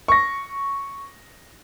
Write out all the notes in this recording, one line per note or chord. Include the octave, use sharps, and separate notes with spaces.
C#6 A#6